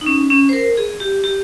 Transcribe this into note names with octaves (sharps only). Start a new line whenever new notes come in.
D#4
C#4
C#4
C5
A#4
G#4
G4
G4